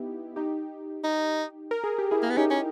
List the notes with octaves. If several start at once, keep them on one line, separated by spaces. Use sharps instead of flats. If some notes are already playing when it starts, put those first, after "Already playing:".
Already playing: B3 D#4 E4 G4
D#4 G4
D#4
A#4
G#4
G4
E4 G#4
A#3
B3
C#4 D#4 G4
C#4